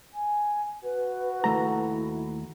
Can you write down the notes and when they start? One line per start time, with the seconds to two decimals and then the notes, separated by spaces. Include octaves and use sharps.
0.13 G#5
0.83 F#4 B4
1.44 D#2 A3 E4 A#5